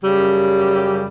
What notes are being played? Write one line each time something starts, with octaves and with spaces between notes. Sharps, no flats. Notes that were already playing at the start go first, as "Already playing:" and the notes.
F#2 C#3 G3 G4